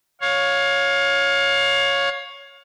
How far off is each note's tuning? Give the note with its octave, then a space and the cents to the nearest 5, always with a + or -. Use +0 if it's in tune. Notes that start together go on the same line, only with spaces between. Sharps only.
C#5 +0 F5 +25